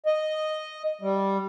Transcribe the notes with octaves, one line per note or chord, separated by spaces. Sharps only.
D#5
G3